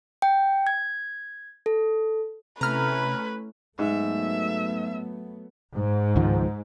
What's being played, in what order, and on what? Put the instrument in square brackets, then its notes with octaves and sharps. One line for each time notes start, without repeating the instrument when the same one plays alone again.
[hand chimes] G5
G#6
A4
[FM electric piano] C3 B5 [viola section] A3 C#4 E4 [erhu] B4 [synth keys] A#5 F6
[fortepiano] G#2 [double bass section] F#3 A3 B3 [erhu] E5
[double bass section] G#2
[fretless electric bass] C#2 D#3 F3